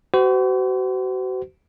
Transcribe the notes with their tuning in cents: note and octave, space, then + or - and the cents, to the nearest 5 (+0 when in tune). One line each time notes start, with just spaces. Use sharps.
F#4 +35 C5 -40